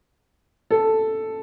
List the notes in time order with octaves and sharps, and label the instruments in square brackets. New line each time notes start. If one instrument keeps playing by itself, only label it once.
[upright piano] A4